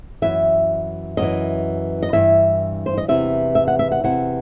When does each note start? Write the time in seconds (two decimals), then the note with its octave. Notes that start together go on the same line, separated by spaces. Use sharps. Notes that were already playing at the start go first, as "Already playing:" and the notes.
0.22 F#2 E3 E5
1.17 F#2 E3 D#5
2.02 D#5
2.13 G2 E3 E5
2.86 C5
2.98 D#5
3.08 E2 C3 E3 E5
3.55 E5
3.68 F#5
3.79 E5
3.92 F#5
4.04 E2 C3 E3 F#5